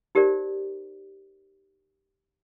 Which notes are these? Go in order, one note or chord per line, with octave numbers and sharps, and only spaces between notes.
D#4 G4 A#4 C5 D5